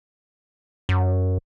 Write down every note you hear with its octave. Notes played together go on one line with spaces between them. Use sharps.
F#2